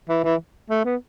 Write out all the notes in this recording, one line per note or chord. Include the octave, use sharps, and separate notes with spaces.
E3
E3
A3
B3